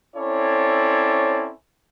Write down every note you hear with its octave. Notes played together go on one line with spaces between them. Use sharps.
C4 C#4 E4 A4 C#5 D5